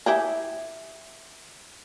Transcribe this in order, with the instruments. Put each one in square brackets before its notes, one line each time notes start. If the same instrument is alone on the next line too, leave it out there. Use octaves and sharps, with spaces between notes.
[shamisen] E4 G4 G#4